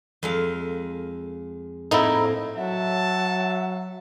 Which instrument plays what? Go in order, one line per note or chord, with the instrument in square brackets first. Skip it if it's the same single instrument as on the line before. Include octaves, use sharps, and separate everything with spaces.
[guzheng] F2 G#3 F5
[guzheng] A2 A#3 C4 [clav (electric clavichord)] D#4 E4
[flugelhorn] F#3 [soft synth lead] E5 [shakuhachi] F#5 [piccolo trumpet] A5